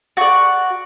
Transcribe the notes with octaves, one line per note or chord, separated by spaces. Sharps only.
F#4 D5